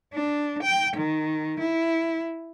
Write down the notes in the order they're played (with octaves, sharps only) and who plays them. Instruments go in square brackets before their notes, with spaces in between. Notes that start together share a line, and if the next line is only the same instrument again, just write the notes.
[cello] D4
G5
D#3
E4